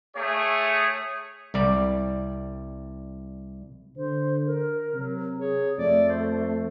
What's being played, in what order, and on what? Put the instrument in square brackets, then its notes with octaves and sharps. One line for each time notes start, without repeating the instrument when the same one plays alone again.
[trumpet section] A3 G#4 C#5
[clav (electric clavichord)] C2 G3 D5
[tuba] D3 [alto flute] C5
[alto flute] A#4
[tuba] C3 [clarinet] F#3
[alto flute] G#4 [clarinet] C#5
[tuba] F2 [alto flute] A3 [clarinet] D5
[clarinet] C5